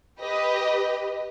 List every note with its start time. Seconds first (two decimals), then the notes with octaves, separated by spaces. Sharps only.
0.19 G4 B4 D#5